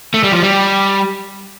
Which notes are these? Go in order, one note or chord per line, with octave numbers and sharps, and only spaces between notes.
A3
G3
F3
G3